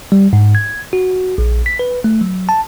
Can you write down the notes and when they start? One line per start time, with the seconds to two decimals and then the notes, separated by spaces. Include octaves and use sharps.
0.12 G3
0.33 G#2
0.55 G#6
0.93 F#4
1.38 A#1
1.66 B6
1.79 B4
2.04 A3
2.21 F#3
2.49 A5